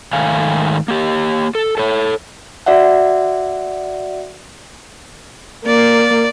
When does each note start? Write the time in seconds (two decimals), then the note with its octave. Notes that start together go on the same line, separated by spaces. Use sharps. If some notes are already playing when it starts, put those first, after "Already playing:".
0.13 G#2 D#3 A3 F5 G#5
0.88 A#3 G4
1.55 A4
1.78 A4 C#5
2.66 F#4 D5 E5 F#5
5.66 A#3 D5